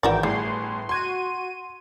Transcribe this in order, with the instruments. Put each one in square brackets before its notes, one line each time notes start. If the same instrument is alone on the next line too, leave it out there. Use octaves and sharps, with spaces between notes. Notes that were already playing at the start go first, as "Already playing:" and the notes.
[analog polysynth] G#1 E3 G5 [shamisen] F#4 A#4 D5
[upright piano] G1 A2 G#4 [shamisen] G3 [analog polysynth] C6
[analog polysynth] F#4 D#7 [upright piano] C6 G#6